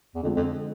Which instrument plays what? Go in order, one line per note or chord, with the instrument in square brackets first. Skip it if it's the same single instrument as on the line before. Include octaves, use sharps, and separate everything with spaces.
[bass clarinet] E2
[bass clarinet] F2 [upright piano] D3 F3 G#3
[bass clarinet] F2